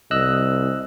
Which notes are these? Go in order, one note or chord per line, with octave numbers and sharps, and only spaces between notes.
C2 D#5 E6 F#6